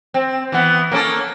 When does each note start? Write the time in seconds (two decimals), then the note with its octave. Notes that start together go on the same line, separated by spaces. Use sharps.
0.14 C4
0.52 E3 B3
0.92 A#3 C#4 A4